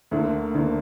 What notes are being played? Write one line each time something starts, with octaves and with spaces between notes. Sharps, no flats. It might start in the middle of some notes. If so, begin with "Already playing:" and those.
D2 D3 A#3
D2 D3 A#3